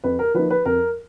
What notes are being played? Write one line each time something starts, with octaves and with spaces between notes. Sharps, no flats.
F2 B4
A#4
F3 A#3 D#4 B4
B4
F2 A#4